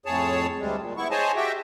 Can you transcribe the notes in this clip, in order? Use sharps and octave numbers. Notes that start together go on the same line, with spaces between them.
F2 A2 G#4 C#5 A5
D2 G3 G#3
A#2
B3 E4 C#6
G#4 C5 C#5 D#5 G#5 A5
F#4 G4 E5 G5